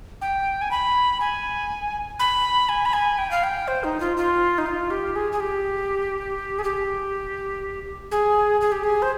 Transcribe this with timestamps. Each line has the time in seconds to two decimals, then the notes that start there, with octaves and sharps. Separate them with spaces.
0.21 G5
0.62 G#5
0.71 B5
1.21 G#5
2.19 B5
2.69 G#5
2.86 B5
2.93 G#5
3.18 G5
3.31 F5
3.44 G5
3.68 C5
3.84 D#4
4.00 F4
4.17 F4
4.58 D#4
4.66 F4
4.90 G4
5.16 G#4
5.32 G#4
5.40 G4
6.59 G#4
6.64 G4
8.11 G#4
8.61 G#4
8.72 G4
8.83 G#4
9.02 C5